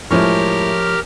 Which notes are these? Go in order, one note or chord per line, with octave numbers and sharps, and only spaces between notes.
A2 F3 G#3 G4 A#4 C#5 F6